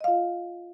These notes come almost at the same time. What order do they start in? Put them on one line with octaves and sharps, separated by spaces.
D#5 F5 F4